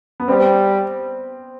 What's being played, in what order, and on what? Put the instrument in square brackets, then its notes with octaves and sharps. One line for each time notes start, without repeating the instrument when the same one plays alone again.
[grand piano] B3
[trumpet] G3 [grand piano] C4